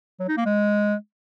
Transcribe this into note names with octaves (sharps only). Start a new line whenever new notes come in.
F#3
D#4
A#3
G#3